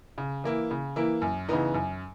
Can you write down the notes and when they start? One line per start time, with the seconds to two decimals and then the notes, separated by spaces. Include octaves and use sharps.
0.18 C#3
0.44 E3 A#3 E4
0.71 C#3
0.96 E3 A#3 E4
1.22 F#2
1.49 C#3 E3 B3 D#4
1.74 F#2